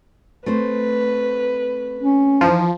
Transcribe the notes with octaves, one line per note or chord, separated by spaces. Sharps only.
A3 C4 B4 C5
C#4
E3 F3 D#4